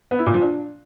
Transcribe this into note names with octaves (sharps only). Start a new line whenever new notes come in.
B3
E4
A#2
F3
D4